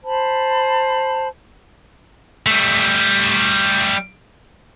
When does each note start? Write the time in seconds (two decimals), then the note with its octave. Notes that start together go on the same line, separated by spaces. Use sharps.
0.03 C5 A5 B5
2.46 G3 A3